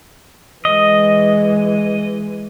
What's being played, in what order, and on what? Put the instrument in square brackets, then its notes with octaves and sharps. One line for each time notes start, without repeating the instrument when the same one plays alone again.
[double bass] E3 G#3 [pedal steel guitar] D#5